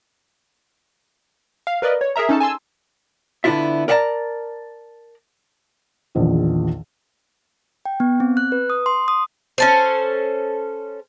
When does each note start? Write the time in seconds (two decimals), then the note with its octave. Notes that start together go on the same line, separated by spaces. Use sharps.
1.67 F5
1.82 A#4 B4 D5 D#5
2.01 C#5
2.16 G#4 A#4 E5 A#5
2.29 C#4 D#4 A4 A5
2.40 G#5 A5 C6 E6
3.44 D3 B3 D4 E4 F4 E5
3.88 A#4 D5 E5 F#5 A5 A#5
6.15 A#1 E2 D#3 F3
7.86 G5
8.00 B3
8.20 C4
8.37 F#6
8.52 B4
8.70 D#6
8.86 C6
9.08 D#6
9.58 C#4 A4 C5